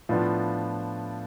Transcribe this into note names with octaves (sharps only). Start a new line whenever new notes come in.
A2 F3 B3 D4 F4